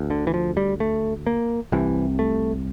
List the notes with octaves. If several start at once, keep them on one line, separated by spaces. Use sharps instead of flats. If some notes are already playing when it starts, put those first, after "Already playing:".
Already playing: D2
D3
E3
F3
G3
A3
A#3
C2 C3 E3
A3